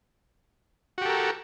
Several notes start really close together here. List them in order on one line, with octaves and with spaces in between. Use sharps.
F#4 G4 A4 A#4